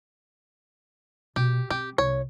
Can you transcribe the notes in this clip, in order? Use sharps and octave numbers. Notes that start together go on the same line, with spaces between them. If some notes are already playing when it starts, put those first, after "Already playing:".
B2 G4
C4 G4
C2 C#5